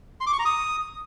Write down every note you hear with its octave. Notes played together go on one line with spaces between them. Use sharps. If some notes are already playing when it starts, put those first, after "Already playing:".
C6
D6
C#6
A#5
D#6